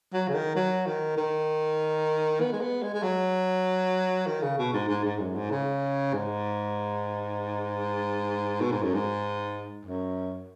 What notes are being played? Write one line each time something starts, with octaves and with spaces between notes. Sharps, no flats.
F#3
C#3
D#3
F#3
D#3
D#3
B3
G#3
B3
G#3
G#3
F#3
D#3
C#3
B2
G#2
G#2
G#2
F#2
G#2
C#3
G#2
B2
G#2
F#2
G#2
F#2